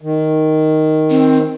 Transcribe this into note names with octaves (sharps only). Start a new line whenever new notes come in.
D#3
C4